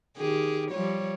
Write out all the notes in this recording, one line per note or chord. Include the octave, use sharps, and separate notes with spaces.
D#3 G4 G#4
F3 G3 C#5